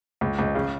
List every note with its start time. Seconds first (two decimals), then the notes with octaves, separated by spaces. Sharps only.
0.21 C#2
0.38 C#2
0.55 C#3